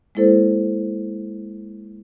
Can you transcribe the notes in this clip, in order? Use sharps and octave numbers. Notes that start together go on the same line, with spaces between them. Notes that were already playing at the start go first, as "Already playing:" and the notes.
G#3 A#3 E4 A4 C5